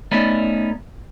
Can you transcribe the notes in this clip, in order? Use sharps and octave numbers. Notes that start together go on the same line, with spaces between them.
A3 B3 C#4 D#4 D5 E5